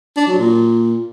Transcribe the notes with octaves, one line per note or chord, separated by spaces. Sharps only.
D4
F#3
A#2